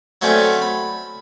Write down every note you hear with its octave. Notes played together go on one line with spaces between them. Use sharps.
F#3 A3 C4 C#4 D5
B5